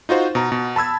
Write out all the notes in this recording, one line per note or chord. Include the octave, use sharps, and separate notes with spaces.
D#4 F4 F#4 C5
B2 A#5
B2
A5 B5 E6 G#6